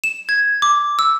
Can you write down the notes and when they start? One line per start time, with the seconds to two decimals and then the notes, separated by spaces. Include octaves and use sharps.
0.04 E7
0.29 G#6
0.62 D6
0.99 E6